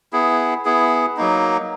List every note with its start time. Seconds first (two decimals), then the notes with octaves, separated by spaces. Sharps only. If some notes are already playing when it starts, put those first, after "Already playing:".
0.13 B3 E4 G#4
0.65 B3 E4 G#4
1.16 F#3 A#3 D#4